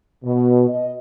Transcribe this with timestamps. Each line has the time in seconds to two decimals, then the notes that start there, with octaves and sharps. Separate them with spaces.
0.24 B2
0.68 D#5